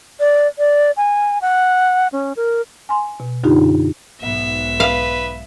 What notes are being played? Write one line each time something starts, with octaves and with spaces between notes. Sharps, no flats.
D5
D5
G#5
F#5
C#4
A#4
G#5 C6
B2
F#2 D3 D4 D#4 F4 G4
B1 G#2 B3 E5
B4 F5